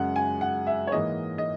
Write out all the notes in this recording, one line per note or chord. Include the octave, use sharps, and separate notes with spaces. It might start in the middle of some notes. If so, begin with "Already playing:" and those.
Already playing: F#2 C#3 G#3 F#5
G#5
F#5
E5
C#5
G#2 E3 A#3 D#5
D#5